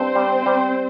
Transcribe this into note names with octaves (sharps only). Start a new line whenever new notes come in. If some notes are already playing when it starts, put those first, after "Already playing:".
Already playing: G2 C4 C5
G3
G3